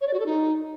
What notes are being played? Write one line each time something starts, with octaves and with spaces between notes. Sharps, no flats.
C#5
D5
F#4
A4
D#4